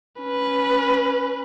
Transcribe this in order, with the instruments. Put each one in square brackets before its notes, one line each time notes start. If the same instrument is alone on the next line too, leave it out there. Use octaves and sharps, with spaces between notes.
[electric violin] C#4 B4